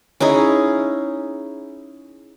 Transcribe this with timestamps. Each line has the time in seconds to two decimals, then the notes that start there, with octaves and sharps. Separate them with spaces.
0.20 C#4 D#4 E4 G#4